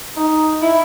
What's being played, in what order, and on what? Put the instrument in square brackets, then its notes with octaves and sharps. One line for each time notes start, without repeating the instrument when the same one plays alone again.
[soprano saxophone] D#4
E4